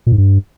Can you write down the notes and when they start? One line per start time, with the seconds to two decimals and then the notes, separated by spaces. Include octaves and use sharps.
0.07 A#2
0.12 G#2
0.18 G2